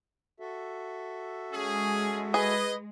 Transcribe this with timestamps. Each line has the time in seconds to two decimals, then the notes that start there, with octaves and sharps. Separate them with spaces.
0.40 F#4 A4 E5
1.53 G#3 C#4 G#4
2.34 G#4 B4 D#5